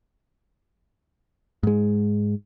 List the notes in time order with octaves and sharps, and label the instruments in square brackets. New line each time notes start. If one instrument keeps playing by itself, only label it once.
[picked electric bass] G#2 G#3